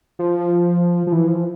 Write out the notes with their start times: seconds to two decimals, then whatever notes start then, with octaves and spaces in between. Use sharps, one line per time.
0.19 F3
1.07 F3
1.12 E3
1.28 F3